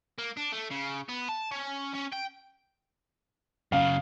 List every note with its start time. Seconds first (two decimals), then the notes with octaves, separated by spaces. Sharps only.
0.18 A#3
0.37 D4
0.53 A3
0.71 C#3
1.09 B3
1.29 A5
1.52 C#4
1.95 C#4
2.13 G5
3.72 F#2 C#3 F5